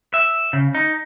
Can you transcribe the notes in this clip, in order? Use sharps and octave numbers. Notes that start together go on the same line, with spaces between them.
E5
C#3
D#4